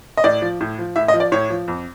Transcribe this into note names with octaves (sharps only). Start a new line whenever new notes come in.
D#5
A2 D5
F3
A2
F3
A2 E5
D#5
F3
D5
A2 C#5
F3
F2